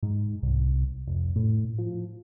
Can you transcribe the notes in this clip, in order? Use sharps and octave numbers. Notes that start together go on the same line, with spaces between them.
G#2
C2
F1
A2
F3